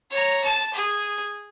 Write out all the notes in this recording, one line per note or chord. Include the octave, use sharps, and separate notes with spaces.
C#5 A#5
A5 E7
G#4